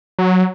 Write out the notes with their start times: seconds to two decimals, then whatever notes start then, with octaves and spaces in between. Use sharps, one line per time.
0.19 F#3